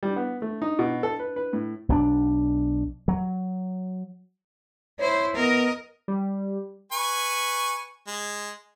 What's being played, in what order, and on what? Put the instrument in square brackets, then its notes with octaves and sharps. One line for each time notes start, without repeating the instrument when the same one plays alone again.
[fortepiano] G3
B3
A3
D#4
B2
A4
B4
B4
A2
[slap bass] B1 F3 D4
F#3
[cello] E4 C5 [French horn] C#5
[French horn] B3 [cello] A#4 D#5
[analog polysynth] G3
[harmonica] B4 G#5 C#6
G#3